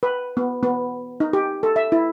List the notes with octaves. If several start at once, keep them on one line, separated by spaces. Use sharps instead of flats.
B4
B3
B3
D#4
G4
A4
E5
E4